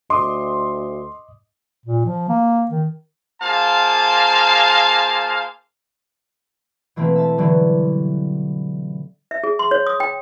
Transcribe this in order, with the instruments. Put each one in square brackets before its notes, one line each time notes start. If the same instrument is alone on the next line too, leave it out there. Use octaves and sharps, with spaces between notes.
[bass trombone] D2 [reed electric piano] D#5 D6 D#6 [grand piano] C6
[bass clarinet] A#2
F3
A#3
D#3
[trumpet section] A#3 F4 G#4 C5 F5 A5
[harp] B2 E3 A3 A#3 C4
E5 A5 A6
D3 E3 F#3 G3
[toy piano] E5
G#4
C6
C#5
D#6
G5